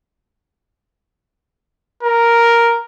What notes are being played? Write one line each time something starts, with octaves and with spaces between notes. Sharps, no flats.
A#4